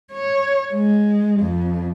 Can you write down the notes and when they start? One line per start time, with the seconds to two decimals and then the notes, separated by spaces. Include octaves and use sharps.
0.12 C#5
0.73 G#3
1.40 F2